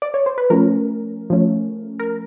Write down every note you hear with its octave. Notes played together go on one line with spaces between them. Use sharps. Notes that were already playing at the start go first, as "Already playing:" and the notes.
D5
C#5
C5
B4
F3 A3 C#4 A#4
F3 A3 C#4
A#4